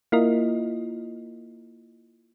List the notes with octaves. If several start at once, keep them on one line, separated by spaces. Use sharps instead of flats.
A#3 E4 F4 A#4 D#5